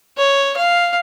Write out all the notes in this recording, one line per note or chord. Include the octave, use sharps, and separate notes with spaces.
C#5
F5